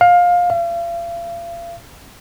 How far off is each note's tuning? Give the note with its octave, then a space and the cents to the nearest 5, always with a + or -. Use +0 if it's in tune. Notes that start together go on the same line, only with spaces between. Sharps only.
F5 +20
F5 -40